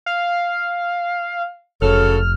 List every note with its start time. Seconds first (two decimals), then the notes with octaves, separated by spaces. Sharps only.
0.06 F5
1.82 F1 C#3 F#3 A4 F6